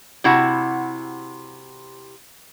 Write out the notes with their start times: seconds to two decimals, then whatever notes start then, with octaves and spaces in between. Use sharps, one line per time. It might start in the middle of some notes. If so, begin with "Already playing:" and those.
0.24 C3 E4 F#4 F#5